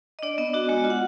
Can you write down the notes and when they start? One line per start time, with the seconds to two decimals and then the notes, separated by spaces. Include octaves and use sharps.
0.19 D#5
0.23 D4 D5
0.38 B3 D#5
0.54 D4 F#4
0.69 G#3 F#4
0.84 F4
0.90 F#5